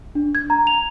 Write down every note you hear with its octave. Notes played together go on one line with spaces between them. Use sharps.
D4
G#6
A#5
F7